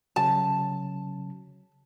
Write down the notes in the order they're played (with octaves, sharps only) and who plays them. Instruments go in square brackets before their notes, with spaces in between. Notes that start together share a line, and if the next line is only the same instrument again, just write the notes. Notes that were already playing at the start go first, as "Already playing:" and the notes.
[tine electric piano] C#3 F#3 [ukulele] A5